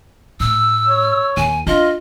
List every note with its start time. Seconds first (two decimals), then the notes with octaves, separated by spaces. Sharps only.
0.40 A2 E6
0.86 C#5
1.37 D#2 G#5
1.67 D4 F4 D#5